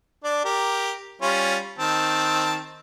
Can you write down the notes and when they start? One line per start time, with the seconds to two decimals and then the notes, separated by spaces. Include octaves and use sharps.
0.24 D4 D5
0.44 G4 A#4
1.22 G3 C#4 F4
1.78 D#3 C4 A5